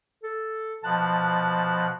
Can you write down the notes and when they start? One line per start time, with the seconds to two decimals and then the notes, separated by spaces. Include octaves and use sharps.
0.23 A4
0.84 B2 F3 A5 F#6